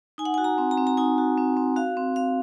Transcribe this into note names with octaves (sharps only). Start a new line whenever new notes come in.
D#4 G#5
F#5
F#4 G#5
A#5
C4
A#5
C4
A#5
D#4 G#5
F#4
C4
C4
F#4 F5
C4
C4 F5